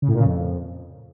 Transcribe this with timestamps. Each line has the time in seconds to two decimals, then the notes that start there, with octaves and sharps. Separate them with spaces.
0.02 C#3
0.08 A2
0.14 A#2
0.20 C#3
0.25 F2